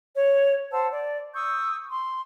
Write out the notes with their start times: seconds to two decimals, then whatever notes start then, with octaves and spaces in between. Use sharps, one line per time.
0.16 C#5
0.72 C5 F#5 A5 E6
0.93 D5
1.34 C#6 D#6 E6 G6
1.89 C6